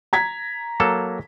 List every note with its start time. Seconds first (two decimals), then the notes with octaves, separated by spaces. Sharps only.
0.13 A#5 G#6 B6
0.80 F#3 A#3 A4